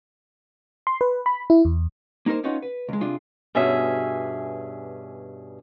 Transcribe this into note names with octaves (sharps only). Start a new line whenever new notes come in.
C6
B4
B5
E4
E2
A#3 D#4 F4 A#4 C5
B3 C#4 D#4 F4 C#5 F#5
B4
C#2 G#3
C3 D4 F4 G#4
G2 B2 C#4 G#4 E5